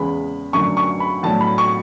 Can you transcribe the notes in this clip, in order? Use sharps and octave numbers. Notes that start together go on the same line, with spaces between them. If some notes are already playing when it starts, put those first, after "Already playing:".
Already playing: E2 C#3 G#3 B5
F#2 D3 A3 D4 C#6
C#6
B5
A2 F#3 B3 D4 A5
B5
C#6